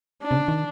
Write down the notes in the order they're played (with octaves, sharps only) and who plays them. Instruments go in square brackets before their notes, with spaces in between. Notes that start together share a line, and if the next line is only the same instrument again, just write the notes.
[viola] D4
[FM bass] C3
C#3
D#3